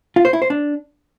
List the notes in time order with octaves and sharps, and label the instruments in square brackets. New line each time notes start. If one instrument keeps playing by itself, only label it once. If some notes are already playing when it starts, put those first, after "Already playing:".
[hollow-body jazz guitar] F4
C5
E4
C5
D4